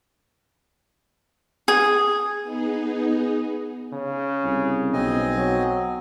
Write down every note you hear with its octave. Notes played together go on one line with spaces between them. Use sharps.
G#4
B3 D#4 G#4
C#3
C2
B1 C4 D#5 G#5
F#3